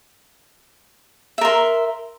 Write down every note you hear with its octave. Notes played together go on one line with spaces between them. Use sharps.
A#4 E5 C6